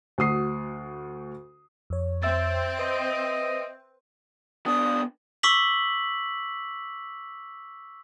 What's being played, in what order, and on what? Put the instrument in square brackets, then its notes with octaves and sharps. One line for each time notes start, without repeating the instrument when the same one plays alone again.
[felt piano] D2 F#4 D#6 C7
[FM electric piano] F2 C#5
[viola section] C4 [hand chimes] E5 E6 A6
[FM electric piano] B4 [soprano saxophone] D#5
[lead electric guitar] B3 D4 [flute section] C#6 D#6
[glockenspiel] C#6 D6 E6 B6 F#7